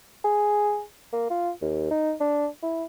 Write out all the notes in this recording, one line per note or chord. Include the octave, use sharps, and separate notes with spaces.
G#4
A#3
F4
D#2
D#4
D4
E4